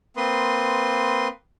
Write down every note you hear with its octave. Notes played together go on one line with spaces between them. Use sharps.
A#3 C4 B4 C6 D#6